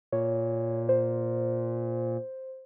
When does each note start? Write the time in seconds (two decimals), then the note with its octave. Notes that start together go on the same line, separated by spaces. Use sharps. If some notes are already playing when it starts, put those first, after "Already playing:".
0.12 A#2 C#5
0.89 C5